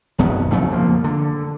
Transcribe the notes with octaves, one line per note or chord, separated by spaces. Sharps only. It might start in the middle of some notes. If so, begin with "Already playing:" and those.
F#1 F#2 B2 B3
C2 F2 C#3 A3
F3 A#3
D3